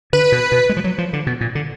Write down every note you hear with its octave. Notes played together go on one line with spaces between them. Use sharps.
D3 B4
B2
B2
G#3
F3
F#3
F3
D3
B2
A#2
D3